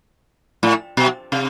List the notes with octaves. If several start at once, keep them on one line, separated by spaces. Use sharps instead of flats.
A2
B2
C3